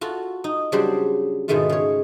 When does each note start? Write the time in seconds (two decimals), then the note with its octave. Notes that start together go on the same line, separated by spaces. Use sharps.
0.01 F4 F#4 A4
0.44 D#4
0.72 C#3 F#3 G3 D4 C5 C6
1.48 G#2 B2 D#3 G#3 A3 F4
1.69 C#3 C#5